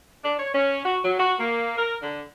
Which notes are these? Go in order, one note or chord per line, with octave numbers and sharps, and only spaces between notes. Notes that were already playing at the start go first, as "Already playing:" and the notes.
D4
C#5
C#4
F#4
F#3
F#4
A#3
A#4
D3